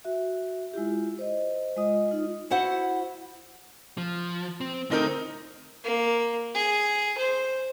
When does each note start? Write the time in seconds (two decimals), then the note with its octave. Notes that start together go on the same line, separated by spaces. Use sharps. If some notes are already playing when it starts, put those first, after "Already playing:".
0.05 F#4 E5
0.74 G#3 E4 F4 G4
1.19 C5 D#5
1.77 G#3 F4 D#5 D#6
2.11 D#4 F4
2.51 E4 F#4 C5 F#5
3.97 F3
4.61 C4
4.91 D3 A3 C4 D#4 A#4
5.84 A#3
6.55 G#4
7.18 C5